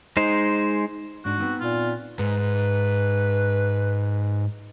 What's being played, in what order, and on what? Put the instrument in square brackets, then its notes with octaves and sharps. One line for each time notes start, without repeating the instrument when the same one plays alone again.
[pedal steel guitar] G#3 D#4 C5
[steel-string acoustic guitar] G#2 D4 A5 [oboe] F#4
[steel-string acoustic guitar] B3 C4 D#4
[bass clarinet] A#2 [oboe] F4
[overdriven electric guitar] G#2 [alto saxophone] B4